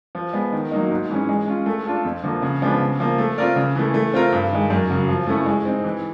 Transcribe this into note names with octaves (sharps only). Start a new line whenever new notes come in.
F3
G#3 B3
D#3
F#3 A#3 D#4
G#2
E3 G#3 C#4
G#3
C#4 F4
A3
D4 F4 A4
F2
D3 F3 A#3
C#3
F3 G#3 B3 D4
C#3
F3 A#3
A3
C4 F4 A#4 D5
C#3
E3 A3
A3
C4 F4 A#4
G2
D#3 G#3
F#2
C#3 F#3
F3
A3 C#4 E4
G#3
C4 D#4
E3